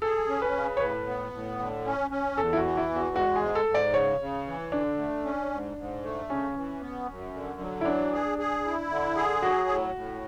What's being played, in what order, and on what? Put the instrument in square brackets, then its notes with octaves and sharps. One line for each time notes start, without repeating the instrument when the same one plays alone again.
[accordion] G#4 [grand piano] A4
[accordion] C#4
[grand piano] B4
[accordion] C#3
[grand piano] C#5
[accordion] A2 [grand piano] B4
[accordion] B3
A2
D3
C#4
C#4
[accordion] E2 [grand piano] A4
[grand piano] E4
F#4
[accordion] E3
[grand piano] E4
[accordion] E2
[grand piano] F#4
[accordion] G#3 [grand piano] F#4
[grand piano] G#4
[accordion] G#2
[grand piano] A4
[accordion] G#2
[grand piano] D5
[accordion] C#3 [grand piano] C#5
[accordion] C#3
E3
[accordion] D3 [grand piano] D4
[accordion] A3
C#4
G#2
G#2
A3
[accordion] C#3 [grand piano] C#4
[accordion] E3
B3
F#2
D3
F#3
[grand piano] E4
[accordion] E3 [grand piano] D4
[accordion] G#4
G#4
E4
D3
G#4
[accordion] F#3 [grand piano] F#4
[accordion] A2
A2